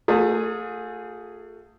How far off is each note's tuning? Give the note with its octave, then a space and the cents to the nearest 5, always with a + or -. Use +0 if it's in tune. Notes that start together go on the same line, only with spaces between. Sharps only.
A3 +25 F4 +45 G#4 +0